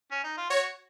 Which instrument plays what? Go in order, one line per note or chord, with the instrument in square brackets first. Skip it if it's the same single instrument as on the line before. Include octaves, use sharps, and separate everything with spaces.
[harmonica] C#4
D#4
F4
[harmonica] F#4 [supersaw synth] C#5